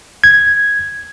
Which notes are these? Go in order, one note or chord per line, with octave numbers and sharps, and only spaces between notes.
G#6